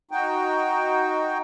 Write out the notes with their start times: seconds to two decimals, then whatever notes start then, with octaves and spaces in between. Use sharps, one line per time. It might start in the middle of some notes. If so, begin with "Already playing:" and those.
0.11 D#4 F#4 G5